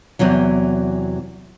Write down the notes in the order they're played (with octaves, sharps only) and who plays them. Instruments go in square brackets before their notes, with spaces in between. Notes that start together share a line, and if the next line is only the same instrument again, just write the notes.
[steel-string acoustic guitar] E2 C3 E3 F#3